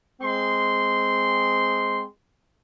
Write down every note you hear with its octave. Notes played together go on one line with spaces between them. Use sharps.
G#3 C4 C6